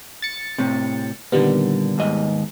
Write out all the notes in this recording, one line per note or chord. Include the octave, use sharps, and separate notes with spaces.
A6 C#7
A2 C3
A#2 D3 D#3 G3 B3
D#2 G#2 D#5